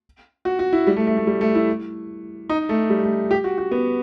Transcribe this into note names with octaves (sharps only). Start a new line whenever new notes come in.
F#4
F#4
E4
G3
A3
A3
A3
G3
A3
E4
D#4
A3
G3
A3
G4
F#4
F#4
B3